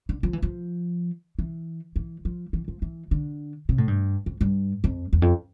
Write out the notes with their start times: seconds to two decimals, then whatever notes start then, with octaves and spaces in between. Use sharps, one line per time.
0.09 D3
0.23 F3
0.33 E3
0.42 F3
1.39 E3
1.96 E3
2.25 F3
2.53 E3
2.68 F3
2.82 E3
3.11 D3
3.69 C3
3.78 A2
3.88 G2
4.26 F2
4.41 G2
4.84 F2
5.13 E2
5.22 F2